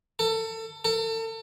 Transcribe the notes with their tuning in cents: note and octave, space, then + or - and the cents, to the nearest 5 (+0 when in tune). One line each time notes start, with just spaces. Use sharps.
A4 +25
A4 +35